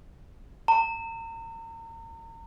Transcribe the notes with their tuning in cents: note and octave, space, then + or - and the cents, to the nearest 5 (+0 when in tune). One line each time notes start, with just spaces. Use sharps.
A#5 -35